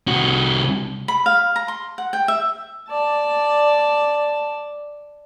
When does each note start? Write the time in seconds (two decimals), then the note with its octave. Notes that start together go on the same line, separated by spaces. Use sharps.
0.08 C2 F#4
1.08 B5
1.26 F5
1.56 A#5
1.68 C6
1.98 F#5
2.13 G5
2.28 E5
2.89 D5 A5